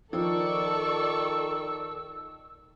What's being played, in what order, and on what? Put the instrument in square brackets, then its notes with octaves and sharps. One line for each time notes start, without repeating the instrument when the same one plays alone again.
[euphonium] D#3 [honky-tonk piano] F3 [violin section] A4 D5 C#6 [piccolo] E6